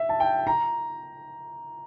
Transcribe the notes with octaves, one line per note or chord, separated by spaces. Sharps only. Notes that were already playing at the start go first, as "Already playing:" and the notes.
Already playing: E5
A5
G5
A#5